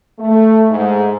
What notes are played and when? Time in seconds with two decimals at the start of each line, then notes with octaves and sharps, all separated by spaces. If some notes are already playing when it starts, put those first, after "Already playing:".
0.19 A3
0.70 G#2